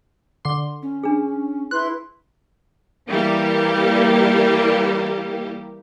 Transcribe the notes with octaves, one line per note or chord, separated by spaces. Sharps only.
D3 C6
C#4
D4 G#4
E4 B4 C6 F#6
E3 G3 A#3 G4